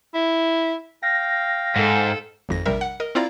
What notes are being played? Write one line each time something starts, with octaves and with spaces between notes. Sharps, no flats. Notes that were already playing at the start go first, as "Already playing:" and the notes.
E4
F5 G5 A#6
G#2 A4
G#1 F2 A#6
A#1 C3 G3 A#4 E5
F#5
A#4 D#5
C4 E4 F4 D5 F5 A#5